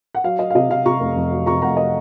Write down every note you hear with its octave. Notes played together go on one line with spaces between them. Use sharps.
F#5
F#3 F5
F#3 D#5
F5
C3 D#5
C3 F5
C3 A#5 C#6
F1
F2
F#3
C3 A#5 C#6
F1 F#5 A#5
D#5